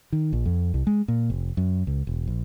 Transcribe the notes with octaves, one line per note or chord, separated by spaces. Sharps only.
D#3
A#1
F2
C2
G#3
A#2
F1
F#2
C#2
E1
A#1